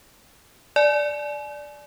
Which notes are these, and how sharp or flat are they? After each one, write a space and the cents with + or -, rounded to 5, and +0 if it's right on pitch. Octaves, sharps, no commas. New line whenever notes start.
D5 +0 G#5 +40